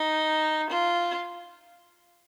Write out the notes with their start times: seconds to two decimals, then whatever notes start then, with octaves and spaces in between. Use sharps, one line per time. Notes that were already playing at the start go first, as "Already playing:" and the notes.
Already playing: D#4
0.70 F4